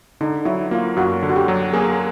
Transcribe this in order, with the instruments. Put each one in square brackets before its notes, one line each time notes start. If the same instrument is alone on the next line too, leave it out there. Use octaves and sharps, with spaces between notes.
[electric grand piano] D3 [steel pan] D#4
[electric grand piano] F#3 [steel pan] E4
[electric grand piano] A#3 [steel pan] F4
[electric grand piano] F#2 [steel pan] F#4
[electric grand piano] D3
[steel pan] F#4
G4
[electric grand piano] F#3
[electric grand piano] A#3 [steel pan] G#4